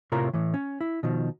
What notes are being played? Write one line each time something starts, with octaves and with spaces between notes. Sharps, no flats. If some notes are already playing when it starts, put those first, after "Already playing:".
A2 C3 F4 A#4 C#5 A#5
A2 E3
C#4
E4
B2 D#3 F3